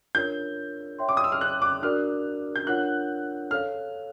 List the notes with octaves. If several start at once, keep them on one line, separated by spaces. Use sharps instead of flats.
D4 F4 A#4 C#5 G6
C#5 E5 G5 C6
D6
D#6
E6
F6
F#6
D6
D4 F#4 A#4 D5 F6
G6
D4 F4 A#4 C#5 F#5 F#6
A4 C#5 F5 F6